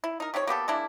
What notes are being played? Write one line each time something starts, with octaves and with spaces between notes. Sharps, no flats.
E4
D#4 A#4
C3 D#3 C#4 C#5
A#3 B3 G4 A4
G#3 A#3 D4 E4